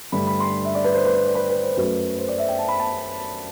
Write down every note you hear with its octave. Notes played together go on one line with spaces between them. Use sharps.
G2 D3 A3 B5
B5
C6
E5
D5
B4
C5
B4
C5
D5
B4
B4
C5
F#2 F#3 A3 B4
C5
D5
E5
G5
A5
B5
A5